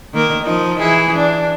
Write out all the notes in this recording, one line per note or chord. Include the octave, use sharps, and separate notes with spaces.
D#3 A#3 A#4
F3 D#4
E3 E4 G#4
D4